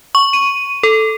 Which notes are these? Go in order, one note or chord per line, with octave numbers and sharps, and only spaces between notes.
C#6
D#7
A4